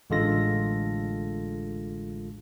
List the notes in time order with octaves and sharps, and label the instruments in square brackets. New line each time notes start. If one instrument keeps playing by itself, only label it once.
[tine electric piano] A1 D3 G#3 F4 A4 A#6